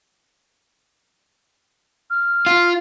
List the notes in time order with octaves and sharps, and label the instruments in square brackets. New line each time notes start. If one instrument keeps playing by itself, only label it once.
[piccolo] F6
[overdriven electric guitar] F4